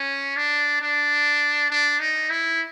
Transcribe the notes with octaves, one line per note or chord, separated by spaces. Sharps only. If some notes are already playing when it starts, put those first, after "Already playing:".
Already playing: C#4
D4
D4
D4
D#4
E4